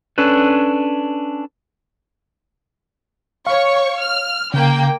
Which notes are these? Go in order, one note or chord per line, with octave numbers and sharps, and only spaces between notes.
C#4 D4 A4 B4
C#5 F5 C#6
F6
C#3 A#3 G5